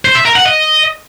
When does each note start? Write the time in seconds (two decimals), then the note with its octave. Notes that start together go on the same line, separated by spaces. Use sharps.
0.05 C5
0.15 E5
0.25 A#4
0.36 F#5
0.46 D#5